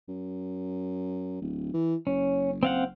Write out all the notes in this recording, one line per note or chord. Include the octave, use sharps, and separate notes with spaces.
F#2
D1
E3
F#1 C#4
C4 F5 F#5